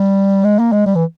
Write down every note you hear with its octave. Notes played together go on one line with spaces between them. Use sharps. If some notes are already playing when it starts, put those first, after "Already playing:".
Already playing: G3
G#3
A#3
G#3
G3
E3